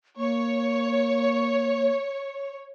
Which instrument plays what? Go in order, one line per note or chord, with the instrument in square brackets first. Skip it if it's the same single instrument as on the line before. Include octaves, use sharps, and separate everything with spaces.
[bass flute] A#3 [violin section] C#5